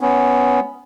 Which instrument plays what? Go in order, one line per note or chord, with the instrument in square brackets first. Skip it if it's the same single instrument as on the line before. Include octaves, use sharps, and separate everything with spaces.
[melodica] B3 C#4